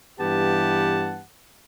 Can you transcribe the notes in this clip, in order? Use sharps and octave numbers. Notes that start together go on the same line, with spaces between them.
G2 E3 B3 G4 F#5 A5